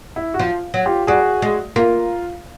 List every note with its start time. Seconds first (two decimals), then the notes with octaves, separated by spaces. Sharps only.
0.16 E4
0.34 F#4
0.39 F3 F4
0.74 F#3
0.86 F4 G4
1.07 G3 F#4 G#4
1.42 G#3
1.76 A#3 F4